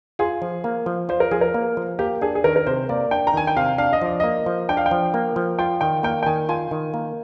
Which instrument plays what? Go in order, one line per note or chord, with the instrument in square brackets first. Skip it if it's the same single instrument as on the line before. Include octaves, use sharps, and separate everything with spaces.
[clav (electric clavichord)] F4 [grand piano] G#4
[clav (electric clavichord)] F3
A#3
F3
[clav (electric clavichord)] F4 [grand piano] C5
[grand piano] A#4
[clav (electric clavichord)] F3 [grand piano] G#4
[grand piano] A#4
[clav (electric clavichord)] A#3
F3
[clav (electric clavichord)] A#3 [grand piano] G4
[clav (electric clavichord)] D4 [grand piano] G#4
[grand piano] G#4
[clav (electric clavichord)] D#3 [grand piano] A#4
[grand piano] A#4
[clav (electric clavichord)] C3 [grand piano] C5
[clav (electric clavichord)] A#3 [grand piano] D5
[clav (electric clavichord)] D4 [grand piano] G5
[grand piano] A#5
[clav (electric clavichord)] D#3 [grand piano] G#5
[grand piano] G5
[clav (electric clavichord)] C3 [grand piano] F5
[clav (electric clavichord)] D4 [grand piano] F5
[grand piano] D#5
[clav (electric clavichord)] F3 [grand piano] D5
[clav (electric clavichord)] A#3 [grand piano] D#5
[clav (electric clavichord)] F3
[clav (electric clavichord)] D4 [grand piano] G5
[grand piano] F5
G5
[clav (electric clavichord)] F3
A#3
F3
[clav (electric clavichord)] F4 [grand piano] G5
[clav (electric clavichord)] D#3 [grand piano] G5
[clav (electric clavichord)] A#3 [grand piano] G5
[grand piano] G5
[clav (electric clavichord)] D#3 [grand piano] G#5
[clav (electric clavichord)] F4 [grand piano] G#5
[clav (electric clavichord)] D#3
A#3